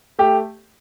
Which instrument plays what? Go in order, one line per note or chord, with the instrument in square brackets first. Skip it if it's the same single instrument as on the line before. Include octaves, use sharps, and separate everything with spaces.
[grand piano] A3 G4